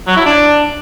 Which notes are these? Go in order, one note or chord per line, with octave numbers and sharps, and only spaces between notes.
F#3
E4
D4